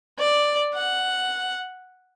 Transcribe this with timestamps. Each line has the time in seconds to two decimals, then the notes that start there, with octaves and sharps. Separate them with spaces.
0.19 D5
0.75 F#5